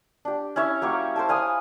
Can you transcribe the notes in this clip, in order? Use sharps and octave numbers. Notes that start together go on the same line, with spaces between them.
D4 G4
C#4 E4 C#5 E5
F#3 A#3 G4 C#6
C5 G5 A5
F5 G#5 B5 D#6